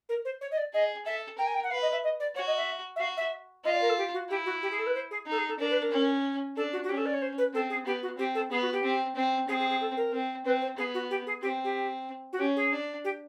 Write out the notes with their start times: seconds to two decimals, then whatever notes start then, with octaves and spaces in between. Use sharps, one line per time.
0.09 A#4
0.25 C5
0.41 C#5
0.51 D#5
0.57 D5
0.73 G#4 D#5
1.06 A4 E5
1.38 A#4 G5
1.46 G#5
1.54 G5
1.63 F#5
1.70 B4 F5
1.82 D#5
1.92 E5
2.03 D#5
2.19 D5
2.35 F#4 C#5
2.47 D#5
2.57 E5
2.96 E5
3.00 F#4 F5
3.17 E5
3.64 F4 D#5
3.73 D5
3.81 A#4
3.89 A4
3.98 G4
4.13 F#4
4.30 E4 G4
4.45 F#4
4.62 G4
4.71 G#4
4.78 A4
4.86 B4
4.94 C5
5.10 G#4
5.26 D#4 A4
5.38 G#4
5.48 A4
5.59 D4 A#4
5.70 B4
5.81 A#4
5.91 C#4
6.56 D4 A4
6.72 F#4
6.83 F#4
6.89 C#4 G4
6.97 A4
7.05 D5
7.13 C#5
7.22 C5
7.38 B4
7.54 C4 A4
7.69 G#4
7.86 B3 G4
8.02 F#4
8.18 C4 G4
8.35 A4
8.51 B3 G#4
8.62 F#4
8.72 G4
8.83 C4
9.15 C4
9.48 C4 G#4
9.59 G#4
9.69 G#4
9.80 A4
9.97 A#4
10.13 C4
10.45 C4 B4
10.61 C5
10.77 B3 G#4
10.94 F#4
11.10 G4
11.26 G#4
11.42 C4 G4
11.64 G4
12.32 F#4
12.39 C#4 G4
12.56 G#4
12.72 D4
13.04 G4